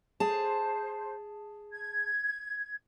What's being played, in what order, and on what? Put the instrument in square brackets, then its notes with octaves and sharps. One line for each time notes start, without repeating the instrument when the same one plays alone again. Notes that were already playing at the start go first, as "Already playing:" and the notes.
[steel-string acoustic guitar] G#4 A5 [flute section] C5
[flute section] G#6